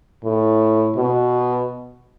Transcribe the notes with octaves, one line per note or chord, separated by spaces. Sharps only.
A2
B2